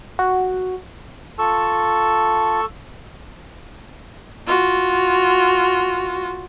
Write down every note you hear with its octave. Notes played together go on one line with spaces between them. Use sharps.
F#4
F4 A4 A5 C#6 E6
F4 F#4